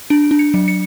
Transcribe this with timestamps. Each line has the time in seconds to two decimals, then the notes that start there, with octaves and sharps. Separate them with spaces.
0.10 D4 D7
0.31 D4
0.39 C#7
0.54 F#3
0.68 C#7